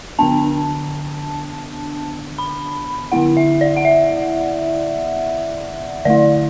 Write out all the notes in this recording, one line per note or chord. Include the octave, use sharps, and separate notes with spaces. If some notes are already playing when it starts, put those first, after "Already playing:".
D3 B3 D4 A5
B5
D3 B3 E4 F#5
E5
D5
F#5
E5
D3 A3 E4 D5